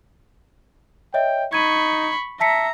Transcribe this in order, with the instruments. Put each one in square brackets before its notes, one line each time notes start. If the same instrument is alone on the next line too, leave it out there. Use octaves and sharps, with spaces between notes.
[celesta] C#5 D#5 E5 [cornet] G5
[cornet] D#4 [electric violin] B5 C#6 [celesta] G#6 D#7
[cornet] E5 [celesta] A5 B6 C#7 [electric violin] A#5